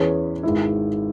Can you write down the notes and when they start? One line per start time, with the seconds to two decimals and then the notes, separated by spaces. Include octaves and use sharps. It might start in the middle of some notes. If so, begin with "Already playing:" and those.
Already playing: E2 E3 C#4 G#4 B4
0.43 G#1 G#2 G#3 E4